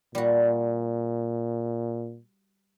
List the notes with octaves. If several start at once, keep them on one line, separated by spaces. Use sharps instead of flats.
A#2 G3 F#4